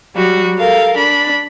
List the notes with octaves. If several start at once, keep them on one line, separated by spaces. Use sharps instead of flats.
F#3 G3 F#4
A4 A#4 F5
D4 B5